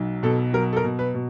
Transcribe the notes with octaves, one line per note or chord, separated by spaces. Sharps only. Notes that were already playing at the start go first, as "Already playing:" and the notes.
Already playing: B1 F#3
B2 A4
F#3 A#4
A4
A#4
B2
B4
B2